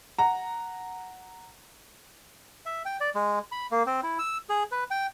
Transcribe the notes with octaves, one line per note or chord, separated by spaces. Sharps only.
F#5 A#5
E5
G5
D5
G#3
B5
A#3
C4
E4
E6
G#4
B4
G5